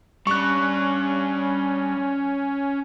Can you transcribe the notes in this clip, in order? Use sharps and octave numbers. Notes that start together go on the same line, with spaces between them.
G3 C#4 D4 C#6 F#6